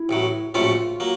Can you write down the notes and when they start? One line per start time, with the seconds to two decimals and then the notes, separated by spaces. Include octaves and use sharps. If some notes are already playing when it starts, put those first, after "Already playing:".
Already playing: E4
0.09 A1 A2 F#3
0.54 A#1 A2 F#3 A3 C#4 F4
1.00 F#3 A#3